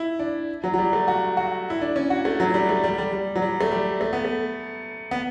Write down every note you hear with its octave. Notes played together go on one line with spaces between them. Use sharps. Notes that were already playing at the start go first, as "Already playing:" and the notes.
Already playing: E4
D4
F#3
F#3
G3
A3
F#4
F#4
E4
D4
C#4
F#4
A3
F#3
G3
A3
G3
G3
G3
F#3
G3
A3
G3
A3
B3
A3
B3